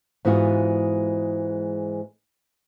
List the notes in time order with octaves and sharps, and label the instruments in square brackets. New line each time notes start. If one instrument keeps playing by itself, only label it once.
[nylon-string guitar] G#2 E3 G#3 B3 F4 F#4